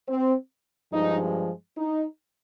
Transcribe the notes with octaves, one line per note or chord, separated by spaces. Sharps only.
C4
G2 F3 G#3 D#4
D#4